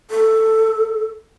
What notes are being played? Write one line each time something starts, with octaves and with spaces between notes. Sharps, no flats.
A4